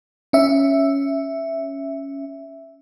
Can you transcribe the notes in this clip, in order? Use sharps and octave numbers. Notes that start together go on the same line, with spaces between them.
C#4 E5